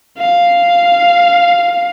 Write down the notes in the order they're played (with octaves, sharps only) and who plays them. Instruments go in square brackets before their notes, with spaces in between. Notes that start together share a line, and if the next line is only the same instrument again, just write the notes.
[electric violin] F5